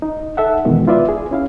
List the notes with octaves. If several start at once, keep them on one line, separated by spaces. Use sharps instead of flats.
D#4
A4 E5 F#5
F2 B2 D#3 E3 G#3 B3
E4 F4 B4 D5 E5
G#4
C#4 E4 F5